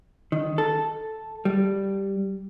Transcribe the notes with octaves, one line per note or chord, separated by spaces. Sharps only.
D#3
A4
G3